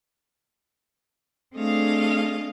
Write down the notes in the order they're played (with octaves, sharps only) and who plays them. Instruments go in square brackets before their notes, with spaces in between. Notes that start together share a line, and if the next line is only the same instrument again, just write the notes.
[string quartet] A3 C4 D4 G#4 D#5 F5